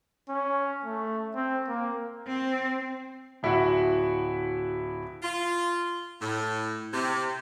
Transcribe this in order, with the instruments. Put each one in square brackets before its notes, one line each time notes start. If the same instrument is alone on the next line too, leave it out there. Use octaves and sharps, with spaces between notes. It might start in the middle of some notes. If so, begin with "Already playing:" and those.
[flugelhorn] C#4
A3
C4
A#3
[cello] C4
[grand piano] D1 E4 F#4 E5 F#5
[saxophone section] F4
A2
C3